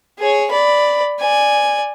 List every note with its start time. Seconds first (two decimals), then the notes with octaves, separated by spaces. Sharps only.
0.19 G#4 C#5
0.51 D5 B5
1.20 D5 G#5